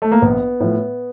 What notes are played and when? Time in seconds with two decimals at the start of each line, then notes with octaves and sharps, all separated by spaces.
0.02 A3
0.12 A#3
0.22 A#1 B3
0.60 A2 F3